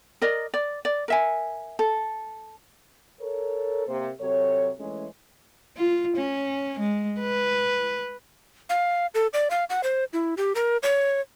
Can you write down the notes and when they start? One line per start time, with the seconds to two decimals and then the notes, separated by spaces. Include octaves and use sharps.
0.22 A#4 D5 D#5
0.54 D5
0.85 D5
1.08 A#4 E5 G#5
1.79 A4
3.20 A4 A#4 C#5
3.87 C3 A#3 C5
4.20 C3 F#3 A4 C#5
4.78 E3 G#3 A3 C#4
5.77 F4
6.17 C#4
6.79 G#3
7.21 B4
8.69 F5
9.14 A4
9.33 D5
9.51 F5
9.70 F#5
9.83 C5
10.13 E4
10.37 G4
10.55 A#4
10.83 C#5